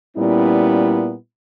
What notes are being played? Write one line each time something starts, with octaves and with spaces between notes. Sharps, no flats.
A#2 G3 B3 C#4 E4